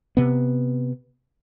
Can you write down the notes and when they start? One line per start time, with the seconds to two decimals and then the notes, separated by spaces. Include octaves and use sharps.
0.17 C3 B3